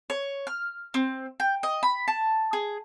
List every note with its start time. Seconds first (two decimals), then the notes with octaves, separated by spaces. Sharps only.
0.10 C#5
0.47 F6
0.94 C4
1.40 G5
1.63 D#5
1.83 B5
2.08 A5
2.53 G#4